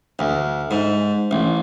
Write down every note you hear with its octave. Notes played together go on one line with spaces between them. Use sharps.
D2
G#2
A1